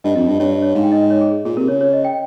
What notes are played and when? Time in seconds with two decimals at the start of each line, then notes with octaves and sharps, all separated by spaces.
0.04 G2 D#5
0.15 F2 D#5
0.28 G2
0.40 G2 C#5
0.51 D#5
0.62 C#5
0.75 G#2 F5
0.83 G5
0.92 D#5
1.02 D#5
1.10 C#5
1.21 G#4
1.45 A#2 G#4
1.57 C3 A#4
1.68 C#3 C#5
1.81 C#5
1.93 D#5
2.05 G5